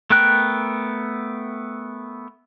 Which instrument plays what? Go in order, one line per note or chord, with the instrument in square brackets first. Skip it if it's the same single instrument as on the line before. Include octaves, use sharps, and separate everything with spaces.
[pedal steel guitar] A3 B3 A#4 G5 F#6